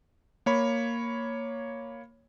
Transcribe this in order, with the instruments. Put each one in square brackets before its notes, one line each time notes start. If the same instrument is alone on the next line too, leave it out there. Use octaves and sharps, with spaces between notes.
[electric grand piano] A#3 C#5 B5